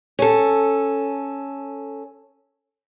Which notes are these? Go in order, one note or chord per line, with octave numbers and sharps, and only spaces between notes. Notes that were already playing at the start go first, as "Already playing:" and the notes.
C#4 A4